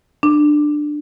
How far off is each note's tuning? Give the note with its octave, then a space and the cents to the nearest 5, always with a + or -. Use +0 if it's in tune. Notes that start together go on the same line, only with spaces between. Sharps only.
D4 +15